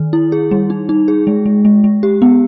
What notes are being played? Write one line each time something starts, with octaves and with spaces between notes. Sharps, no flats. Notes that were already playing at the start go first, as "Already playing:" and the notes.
Already playing: D#3
E4
G#4
G3
D#4
D#4
G#4
G#3
G#3
G#3
G#3
G4
B3